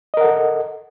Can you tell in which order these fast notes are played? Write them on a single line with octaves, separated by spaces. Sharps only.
D#5 A#4 F#5 A4